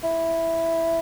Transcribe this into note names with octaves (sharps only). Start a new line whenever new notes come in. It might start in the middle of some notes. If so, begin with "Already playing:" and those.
E4